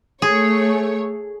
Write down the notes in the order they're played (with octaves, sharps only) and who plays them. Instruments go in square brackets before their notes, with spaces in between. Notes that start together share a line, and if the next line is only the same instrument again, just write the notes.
[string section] A3 C#5 [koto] G#4